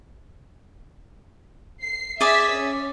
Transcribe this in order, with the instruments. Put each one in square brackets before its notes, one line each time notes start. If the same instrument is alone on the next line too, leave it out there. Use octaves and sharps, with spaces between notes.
[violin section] C7
[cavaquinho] G#4 D5 [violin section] E5 B6
[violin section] C#4